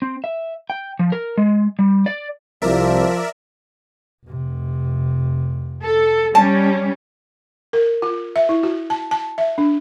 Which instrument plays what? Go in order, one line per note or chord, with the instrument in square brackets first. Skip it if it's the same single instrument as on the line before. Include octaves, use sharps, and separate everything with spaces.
[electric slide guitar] C4
E5
G5
F3
A#4
G#3
G3
D5
[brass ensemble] C2 [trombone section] F3 [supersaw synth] A#4 D5 E5
[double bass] F1 C3
[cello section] A4
[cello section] G3 C#4 [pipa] A5
[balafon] A#4
F4
E5
E4
F#4
A5
A5
E5
D4